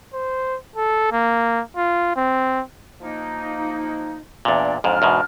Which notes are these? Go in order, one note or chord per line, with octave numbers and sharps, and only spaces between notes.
C5
A4
A#3
F4
C4
F3 A#3 D#4
E2 A#2 D4 D5
F2 G#2 F#3 D4 F6
E2 G#2 B2